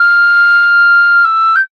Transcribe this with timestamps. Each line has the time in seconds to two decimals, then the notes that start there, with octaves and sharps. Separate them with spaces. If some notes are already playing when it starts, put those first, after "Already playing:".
Already playing: F6
1.25 E6
1.56 G6